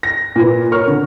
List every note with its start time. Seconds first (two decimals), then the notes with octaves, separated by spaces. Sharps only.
0.03 A#6
0.36 A#2 B4
0.71 A#4 C#5 C#6 F6
0.87 D3